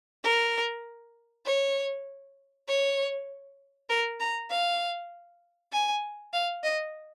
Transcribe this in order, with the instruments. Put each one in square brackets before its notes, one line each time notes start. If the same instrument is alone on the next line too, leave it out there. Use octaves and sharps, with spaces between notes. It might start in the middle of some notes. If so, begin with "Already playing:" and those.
[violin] A#4
C#5
C#5
A#4
A#5
F5
G#5
F5
D#5